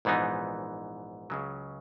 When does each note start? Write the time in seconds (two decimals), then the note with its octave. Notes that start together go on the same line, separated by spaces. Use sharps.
0.05 A#1 G#2 E3 B3 D#4
1.30 C#2 C#3 F#3